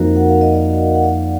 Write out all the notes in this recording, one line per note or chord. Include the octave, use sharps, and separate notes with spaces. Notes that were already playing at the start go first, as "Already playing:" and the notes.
Already playing: F2 F3 A#3 D#4 F#4 A#4
F#5
F5
D#5
D5 F5
F#5
D5 F5